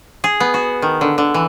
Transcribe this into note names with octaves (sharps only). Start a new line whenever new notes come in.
G#4
B3
F#4
D#3
D3
D3
E3